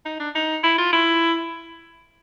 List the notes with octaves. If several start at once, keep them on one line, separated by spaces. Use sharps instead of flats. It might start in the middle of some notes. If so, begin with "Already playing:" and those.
D#4
D4
D#4
E4
F4
E4